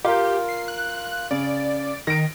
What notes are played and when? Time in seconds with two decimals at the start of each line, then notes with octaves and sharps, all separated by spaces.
0.05 F4 G4 A#4
0.49 C7
0.68 F#6
1.31 C#3 D5
2.07 D#3 A#6 D7